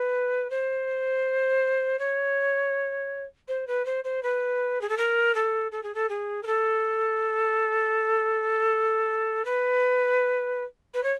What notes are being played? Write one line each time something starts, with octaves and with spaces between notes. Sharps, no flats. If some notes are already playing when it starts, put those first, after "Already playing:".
Already playing: B4
C5
C#5
C5
B4
C5
C5
B4
G#4
A4
A#4
A4
A4
G#4
A4
G#4
A#4
A4
B4
B4
C#5